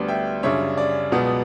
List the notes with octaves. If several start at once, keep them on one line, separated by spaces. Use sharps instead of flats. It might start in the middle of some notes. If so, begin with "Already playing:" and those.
Already playing: D2 D3 G3 B3 D4
E5 G5
F#2 C#3 G3 D4 C#5 E5
D5
C#2 B2 F#3 B3